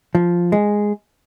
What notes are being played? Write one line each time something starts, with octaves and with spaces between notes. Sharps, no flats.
F3
G#3